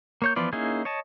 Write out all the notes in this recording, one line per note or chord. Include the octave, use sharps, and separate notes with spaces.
A#3 C#5 G6
E3 F3 B3 F4 D5
A#3 C#4 D#4 E4 G#4
C#5 D#5 A5